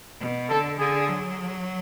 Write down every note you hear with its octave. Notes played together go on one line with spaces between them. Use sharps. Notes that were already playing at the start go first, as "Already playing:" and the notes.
B2
D3 A4
D3 G#4
F#3